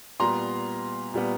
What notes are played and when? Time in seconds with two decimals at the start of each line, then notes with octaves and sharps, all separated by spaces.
0.20 A#2 G3 B3 A#5 C6
1.14 A#2 G3 B3